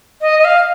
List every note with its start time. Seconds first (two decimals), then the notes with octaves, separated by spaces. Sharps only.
0.21 D#5
0.39 D#5
0.45 F5